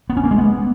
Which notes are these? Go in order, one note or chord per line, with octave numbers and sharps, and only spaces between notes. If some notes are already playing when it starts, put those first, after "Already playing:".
B3
C#4
A#3
G#3
B3